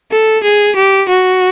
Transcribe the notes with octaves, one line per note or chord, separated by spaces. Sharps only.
A4
G#4
G4
F#4